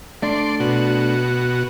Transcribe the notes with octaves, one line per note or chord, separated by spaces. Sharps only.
A3 D4 D5 C6
B2 F#4